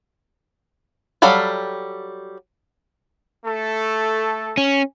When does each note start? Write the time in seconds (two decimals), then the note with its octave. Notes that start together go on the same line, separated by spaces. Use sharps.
1.22 F#3 G3 A4 F5 B5
3.45 A3 A4
4.57 C#4